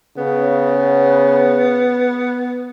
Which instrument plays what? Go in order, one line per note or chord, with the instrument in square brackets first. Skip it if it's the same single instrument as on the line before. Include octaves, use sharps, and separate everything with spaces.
[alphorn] C#3 [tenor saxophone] B3